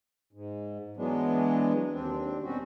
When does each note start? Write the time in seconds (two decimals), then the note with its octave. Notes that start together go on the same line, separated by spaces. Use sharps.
0.33 G#2
0.97 E3 F#3 G#3 B3 D4
1.92 D#2 C4 D4
2.43 B2 G3 C4 C#4 F#4